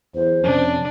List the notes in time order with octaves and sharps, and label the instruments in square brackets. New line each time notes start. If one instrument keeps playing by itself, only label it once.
[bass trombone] E2 [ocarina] C5
[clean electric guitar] F2 C3 [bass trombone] C#4 [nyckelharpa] D4